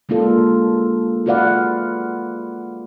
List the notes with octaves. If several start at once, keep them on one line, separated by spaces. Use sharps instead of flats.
G#3 A#3 D4 F4 A4
F4 F#4 B4 D5 F5 F#5